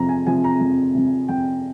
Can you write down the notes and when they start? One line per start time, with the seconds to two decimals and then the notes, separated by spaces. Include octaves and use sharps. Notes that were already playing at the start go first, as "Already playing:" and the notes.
Already playing: F2 C3 F3 A#5
0.09 G#5
0.27 C3 F3 G#5
0.44 A#5
0.61 F2
0.95 C3 F3
1.29 F2 G5